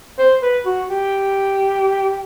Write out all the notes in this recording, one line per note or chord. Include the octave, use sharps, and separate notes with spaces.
C5
B4
F#4
G4